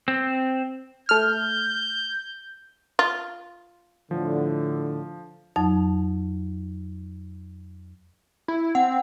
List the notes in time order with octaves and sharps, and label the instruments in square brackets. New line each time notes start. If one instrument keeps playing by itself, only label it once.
[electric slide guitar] C4
[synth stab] A3 F6 [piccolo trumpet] G6
[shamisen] F4
[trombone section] A2 D3 [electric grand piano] F3
[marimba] F2 F#3 D#4 A5
[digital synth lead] E4
[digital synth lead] C4 [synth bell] F#5